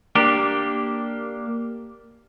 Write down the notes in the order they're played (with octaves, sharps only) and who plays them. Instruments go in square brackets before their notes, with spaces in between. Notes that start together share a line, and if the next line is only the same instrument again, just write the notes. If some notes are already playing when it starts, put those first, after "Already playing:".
[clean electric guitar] A#3 D4 G4